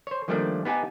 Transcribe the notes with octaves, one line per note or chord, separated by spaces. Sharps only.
C5 C#5
D#3 F3 G3 A3 A#3 D4
B3 D#4 G4 G#5 A5